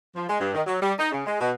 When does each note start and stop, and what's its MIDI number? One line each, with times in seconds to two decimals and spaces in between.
0.16 0.28 53
0.29 0.39 56
0.40 0.53 43
0.54 0.62 51
0.66 0.78 54
0.81 0.93 55
0.99 1.09 63
1.12 1.23 49
1.27 1.38 56
1.40 1.52 47